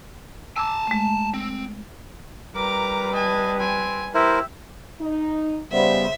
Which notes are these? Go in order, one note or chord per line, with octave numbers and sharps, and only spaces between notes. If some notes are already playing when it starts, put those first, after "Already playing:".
G#5 A5 D6 E6
G#3 A3
C4
G3 A#4 B4 A#5 D6
D#5 G#5 A5
C4 G#5
E4 G4 A#4 C5 E5
D#4
C#3 G3 B3 C5 E5